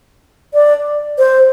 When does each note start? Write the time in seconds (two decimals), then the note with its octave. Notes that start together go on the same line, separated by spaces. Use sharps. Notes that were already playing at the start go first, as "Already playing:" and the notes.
0.54 D5
1.18 C5